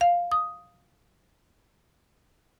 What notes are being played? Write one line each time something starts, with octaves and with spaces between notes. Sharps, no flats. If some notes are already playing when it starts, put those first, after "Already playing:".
F5
D#6